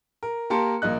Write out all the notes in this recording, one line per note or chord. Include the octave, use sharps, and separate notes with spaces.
A#4
A#3 G4 A#4 A5 C6 C#7
A#1 A#3 D#5 F#6